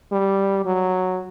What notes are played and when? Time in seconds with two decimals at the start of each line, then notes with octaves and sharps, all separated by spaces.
0.12 G3
0.65 F#3